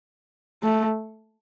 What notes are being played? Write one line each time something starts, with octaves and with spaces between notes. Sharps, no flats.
A3